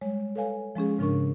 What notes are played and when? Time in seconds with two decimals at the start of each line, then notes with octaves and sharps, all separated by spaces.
0.01 G3 G#3 C#5
0.36 A4 B4 C#5 F5 G#5
0.75 F3 G#3 C#4 G#4
0.98 G#2 C#3 F3 D4 A#4 C#6